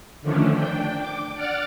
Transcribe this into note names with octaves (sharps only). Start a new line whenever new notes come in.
D3 D#3 F3 A3 C#4 D4
D4 G5
D6
D5 F#5 D6 F6 A6